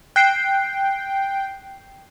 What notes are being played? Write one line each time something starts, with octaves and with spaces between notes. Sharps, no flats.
G5 F#6 C7